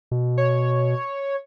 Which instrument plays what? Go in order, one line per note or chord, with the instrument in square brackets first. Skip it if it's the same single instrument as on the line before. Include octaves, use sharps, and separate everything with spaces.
[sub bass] B2
[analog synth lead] C#5